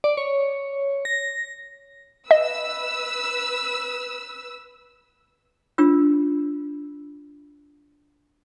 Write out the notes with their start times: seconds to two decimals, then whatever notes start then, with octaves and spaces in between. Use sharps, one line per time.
0.04 D5
0.17 C#5
1.05 A#6
2.31 B4 D#5 E6
5.78 D4 F4 E6